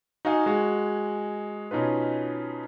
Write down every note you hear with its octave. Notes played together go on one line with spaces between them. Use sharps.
D#4 F#4 D#5 F5 G#5
G#3 F#4 G#5
B2 C#4 D#4 F4 B4